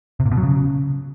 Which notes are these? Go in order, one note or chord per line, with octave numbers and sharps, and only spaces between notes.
C3
A#2
B2
F#3
C#3